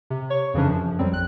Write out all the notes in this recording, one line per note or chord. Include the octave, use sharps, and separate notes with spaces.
C3
C#5 C#6
F2 C#3 E3 F3 C#4 D4
F#2 F3
F2 F#3 G3 C4
A#1 F#6